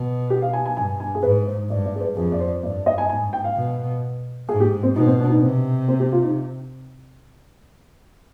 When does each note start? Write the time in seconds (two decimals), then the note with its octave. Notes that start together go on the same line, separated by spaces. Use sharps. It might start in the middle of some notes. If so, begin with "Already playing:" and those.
Already playing: B2
0.30 G4
0.42 F5
0.53 G#5
0.66 G#5
0.76 G2 G#5
1.00 G#5
1.15 G#4
1.23 G#2 B4
1.47 C5
1.70 G2 D5
1.85 D5
1.95 G#4
2.01 B4
2.16 F2 G#4
2.32 D5
2.40 C5
2.63 G2 D5
2.86 D#5
2.98 G#5
3.09 G#2 G#5
3.33 G5
3.44 F5
3.56 B2
4.49 G#2 G#4
4.60 G4
4.83 C4
4.95 B2 D#4
5.07 C4
5.19 D4
5.30 D#4
5.41 C3 C4
5.88 C4
6.00 G4
6.12 F4
6.24 D#4